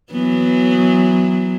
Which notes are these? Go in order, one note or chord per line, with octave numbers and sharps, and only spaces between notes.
E3 F#3 B3